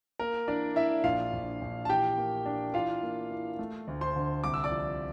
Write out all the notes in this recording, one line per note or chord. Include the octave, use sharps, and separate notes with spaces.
A#3 A#4
E3 D4 D5
D4 E4 E5
A#1 F4 F5
A#1
A#1
A5
E3 G4 G5
A#3
D4
E3 F4 F5
A#3
E3
A3
D2
C5 C6
D3
C2 D6
E6
D5 D6
F3